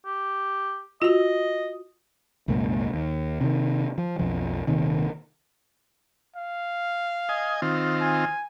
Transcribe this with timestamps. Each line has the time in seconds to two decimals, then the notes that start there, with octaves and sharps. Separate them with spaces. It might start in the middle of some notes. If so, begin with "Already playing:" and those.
0.06 G4
1.02 F4 F#4 D#5
2.48 C2 F#2 A#2 G#3
2.94 D#2
3.41 C3 D#3
3.98 F3
4.19 B1 F2 F3
4.67 D#1 D#2 C3 D#3
6.36 F5
7.29 D#5 G#5
7.62 D#3 C4 F4
8.01 G#5